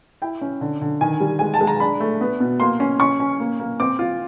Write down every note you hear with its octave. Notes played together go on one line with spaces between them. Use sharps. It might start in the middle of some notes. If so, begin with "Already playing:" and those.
E4 G5
C#4
D3
D3
D#3 G#5
G3
G#3 G#5
A5
G#3
A#5
D4 B5
A3
B3
B2
A#3 C6
C#4
C#4 C#6
C#4
A#3
A#3
C4 D6
F4